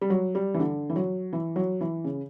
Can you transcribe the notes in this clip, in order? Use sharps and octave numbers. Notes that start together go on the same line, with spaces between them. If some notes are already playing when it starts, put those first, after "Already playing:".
G3
F#3
G3
E3
D3
E3
F#3
E3
F#3
E3
C#3